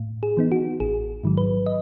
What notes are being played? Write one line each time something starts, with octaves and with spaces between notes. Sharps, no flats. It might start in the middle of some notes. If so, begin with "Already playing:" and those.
Already playing: A2
G#4
E3 B3 D#4
F#4
A1 G#4
G#2 D#3 F#3
B4
D#5